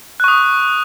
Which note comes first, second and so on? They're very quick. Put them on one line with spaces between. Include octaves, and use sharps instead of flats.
F#6 C#6 D#6